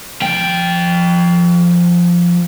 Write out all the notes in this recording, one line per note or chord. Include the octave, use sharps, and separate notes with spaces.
F3 G5